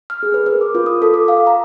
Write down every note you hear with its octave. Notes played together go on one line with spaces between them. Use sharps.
F6
G#4
B4
A#4
D6
F4
D#6
A4
D6
F5
A#5